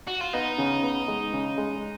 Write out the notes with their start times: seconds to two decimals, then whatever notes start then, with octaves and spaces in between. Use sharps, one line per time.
0.07 F#4
0.20 F4
0.33 B3 D#4
0.58 C#3
0.83 B3
1.08 G#3
1.33 C#3
1.58 G#3